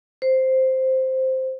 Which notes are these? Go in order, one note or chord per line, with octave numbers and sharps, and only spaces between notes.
C5